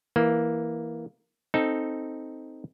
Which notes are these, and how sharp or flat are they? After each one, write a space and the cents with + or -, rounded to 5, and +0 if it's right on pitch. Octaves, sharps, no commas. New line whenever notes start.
E3 +0 A#3 +5
C4 +0 D#4 +0 A4 +0